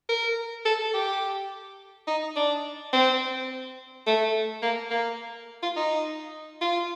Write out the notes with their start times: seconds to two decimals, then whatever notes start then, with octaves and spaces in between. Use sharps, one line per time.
0.09 A#4
0.65 A4
0.94 G4
2.07 D#4
2.36 D4
2.93 C4
4.06 A3
4.62 A#3
4.91 A#3
5.63 F4
5.76 D#4
6.61 F4